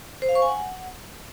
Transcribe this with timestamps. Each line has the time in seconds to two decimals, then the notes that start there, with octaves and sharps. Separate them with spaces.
0.22 C5
0.29 F5
0.35 C#6
0.42 G#5
0.49 F#5